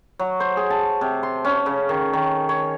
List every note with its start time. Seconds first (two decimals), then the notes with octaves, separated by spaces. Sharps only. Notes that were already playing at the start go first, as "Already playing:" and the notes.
0.19 F#3
0.40 C5
0.57 G#4
0.70 A5
1.01 C3
1.23 C6
1.45 C#4
1.66 C#3
1.89 D#3
2.13 D#3
2.49 C#5